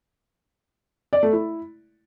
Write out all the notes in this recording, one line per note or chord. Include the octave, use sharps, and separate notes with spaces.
D5
A3
E4